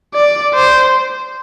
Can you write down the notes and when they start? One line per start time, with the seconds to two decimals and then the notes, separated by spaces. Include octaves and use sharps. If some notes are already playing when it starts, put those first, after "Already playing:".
0.15 D5
0.55 C5